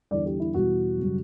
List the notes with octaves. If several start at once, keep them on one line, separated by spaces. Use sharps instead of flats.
E2 D3 G3 D5
G4
E4
E2 B2 G3 F#4
F#2 C#3 G3